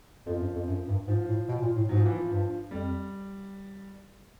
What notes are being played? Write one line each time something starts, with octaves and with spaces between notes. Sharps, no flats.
F2 F3
F#2
F2
F#2
G2
G#2 F3
A2
B2
A#2
A2
G#2 F#3
F3
E3
F3
G2
F2 G3